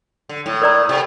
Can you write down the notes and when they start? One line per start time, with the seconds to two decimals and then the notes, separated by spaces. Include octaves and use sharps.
0.29 D3
0.46 A2
0.62 A#4 D5 A#5
0.89 C3